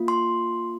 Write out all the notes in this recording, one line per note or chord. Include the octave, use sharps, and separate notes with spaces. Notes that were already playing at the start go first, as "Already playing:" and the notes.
Already playing: A#3 F4
C6